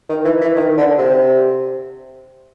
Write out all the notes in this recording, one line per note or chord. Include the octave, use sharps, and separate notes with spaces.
D#3
E3
E3
D#3
D3
C3